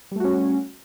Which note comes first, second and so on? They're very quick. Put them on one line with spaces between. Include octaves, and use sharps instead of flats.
G3 A3 F#4 C#4